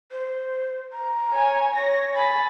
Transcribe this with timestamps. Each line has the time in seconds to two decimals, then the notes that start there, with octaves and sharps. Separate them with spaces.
0.11 C5
0.92 A#5
1.33 C#5 G#5
1.76 C#5 A#6
2.14 G#5 B5 A6 B6